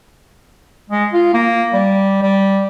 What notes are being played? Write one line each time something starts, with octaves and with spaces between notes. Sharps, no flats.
G#3
F4
A#3
G3
G3